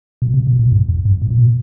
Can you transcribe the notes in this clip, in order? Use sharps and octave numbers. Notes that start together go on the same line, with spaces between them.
B2
C3
B2
A#2
G2
F2
G2
A2
A#2
B2